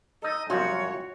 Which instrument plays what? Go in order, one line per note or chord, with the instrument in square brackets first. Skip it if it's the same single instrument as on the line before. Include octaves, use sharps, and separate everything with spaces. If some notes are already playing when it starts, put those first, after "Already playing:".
[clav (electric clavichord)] D#4 A4 [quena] D#5
[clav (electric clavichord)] C2 F#2 F3 [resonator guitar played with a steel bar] F#4 [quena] C#5